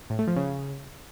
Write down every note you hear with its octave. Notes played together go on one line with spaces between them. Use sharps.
A2
A3
F3
C#3